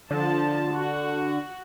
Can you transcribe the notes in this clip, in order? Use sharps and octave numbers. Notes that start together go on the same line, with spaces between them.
D3 F3 A5
F#4